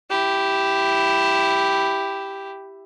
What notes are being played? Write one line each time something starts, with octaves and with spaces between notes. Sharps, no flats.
E4 G4